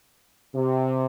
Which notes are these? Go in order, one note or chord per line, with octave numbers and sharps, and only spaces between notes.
C3